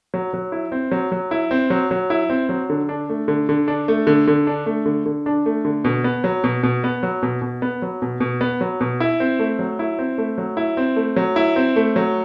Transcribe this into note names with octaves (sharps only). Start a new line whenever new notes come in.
F#3
F#3
E4
C4
F#3
F#3
E4
C4
F#3
F#3
E4
C4
F#3
D3
D4
A3
D3
D3
D4
A3
D3
D3
D4
A3
D3
D3
D4
A3
D3
B2
B3
F#3
B2
B2
B3
F#3
B2
B2
B3
F#3
B2
B2
B3
F#3
B2
E4
C4
A3
F#3
E4
C4
A3
F#3
E4
C4
A3
F#3
E4
C4
A3
F#3